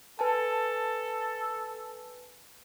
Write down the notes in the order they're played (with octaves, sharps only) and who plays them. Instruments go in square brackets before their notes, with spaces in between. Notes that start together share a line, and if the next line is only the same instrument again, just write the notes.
[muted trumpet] A4 [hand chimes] B4 G#5 A5